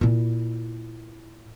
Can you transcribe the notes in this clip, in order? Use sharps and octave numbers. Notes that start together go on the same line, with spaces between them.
A#2 E4